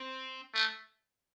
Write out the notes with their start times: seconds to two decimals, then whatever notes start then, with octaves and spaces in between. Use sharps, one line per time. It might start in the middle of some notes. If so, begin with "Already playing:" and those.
Already playing: C4
0.54 A3